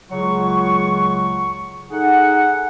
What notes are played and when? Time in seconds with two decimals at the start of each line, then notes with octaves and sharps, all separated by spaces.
0.10 C#2 C#3 F#3 F4 F#5 C#6
1.90 D#4 G#4 A4 F#5